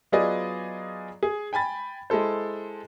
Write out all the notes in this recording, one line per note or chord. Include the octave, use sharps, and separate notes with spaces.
F#3 B3 F4 G#4 D5 D#5
G#4
G5 G#5 B5 A6
G#3 E4 A4 C5